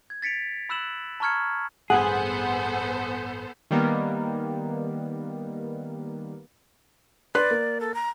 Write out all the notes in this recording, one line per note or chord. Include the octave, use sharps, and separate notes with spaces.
G#6
A6 B6 C#7 D7 F7
B5 E6 F#6 E7 F#7
A5 A#5 C#6 F6 G#6 C#7
A1 G2 B3 G#4 A4 C5 F#5 G#5
D#3 G3 A#3 B3
B4 D5 C6 F#6
A#3
A4
A#5